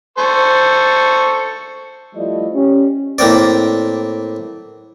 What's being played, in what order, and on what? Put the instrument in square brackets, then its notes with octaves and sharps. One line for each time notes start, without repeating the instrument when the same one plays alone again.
[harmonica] A4 C5 C#6
[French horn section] F3 G3 A3 E4 D5 D#5
C#4 G4
[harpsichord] A2 A#3 C4 D5